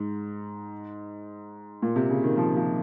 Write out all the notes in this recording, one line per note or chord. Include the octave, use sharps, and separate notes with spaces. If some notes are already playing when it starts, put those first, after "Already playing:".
Already playing: G#2
A#2
C3
C#3
D#3
F3
F3